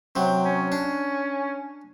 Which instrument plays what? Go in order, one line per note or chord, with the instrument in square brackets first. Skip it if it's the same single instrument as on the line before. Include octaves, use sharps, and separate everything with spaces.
[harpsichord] C3 F#3 [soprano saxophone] G5
[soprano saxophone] C#4
[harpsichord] D4